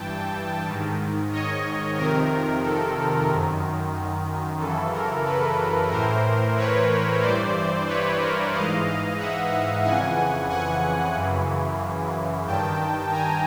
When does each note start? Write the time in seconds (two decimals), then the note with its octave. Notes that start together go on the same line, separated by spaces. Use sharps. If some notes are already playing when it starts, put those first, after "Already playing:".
Already playing: G2 E3 G5 A5
0.66 G#2 D#3
1.32 C#5 D#5
1.97 F2 C3 D#3 A#4
2.63 A4
3.28 F#2 D#3
4.60 F#2 C#3 E3 A4
4.92 A#4
5.26 A4 B4
5.90 A2 E3 A#4 C5
6.57 B4 C#5
7.21 G2 E3 C5 D5
7.87 B4 C#5
8.20 A#4 C5
8.53 G#2 E3 D#5 F5
9.18 E5 F#5
9.84 F2 C#3 E3 F#5 G#5
10.50 F#5 G#5
11.15 F#2 C#3 E3
12.46 G2 D#3 G5 A5
13.12 G#5 A#5